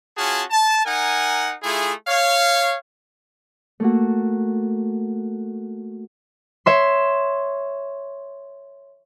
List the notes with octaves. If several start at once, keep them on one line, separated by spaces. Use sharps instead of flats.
C#4 F4 F#4 G#4 A5
A5
D#4 A#4 F#5 G#5
A3 E4 F4 G#4
C#5 F5
A3 A#3 F#4
C#5 E5 C6